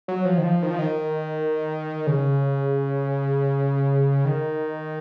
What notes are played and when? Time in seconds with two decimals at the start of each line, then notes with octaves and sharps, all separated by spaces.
0.08 F#3
0.25 F3
0.38 D#3
0.44 F3
0.63 D#3
0.71 F3
0.79 D#3
2.07 C#3
4.25 D#3